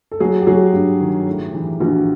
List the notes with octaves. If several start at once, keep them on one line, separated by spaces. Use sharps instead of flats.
A4
F#3 F#4 G#4
G4
F#3 F#4 G#4
G2 G4
D#3
A2
E3
A#1 F#4